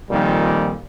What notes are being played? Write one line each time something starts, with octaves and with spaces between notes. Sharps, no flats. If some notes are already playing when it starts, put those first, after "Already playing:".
F2 A#2 D#3 G3